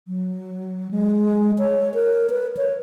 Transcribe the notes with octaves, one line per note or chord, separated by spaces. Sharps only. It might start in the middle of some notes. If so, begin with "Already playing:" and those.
F#3
G#3
C#5
A#4
B4
C#5